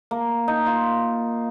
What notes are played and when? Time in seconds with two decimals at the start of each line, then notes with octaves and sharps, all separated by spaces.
0.11 A#3
0.48 D#4
0.66 F4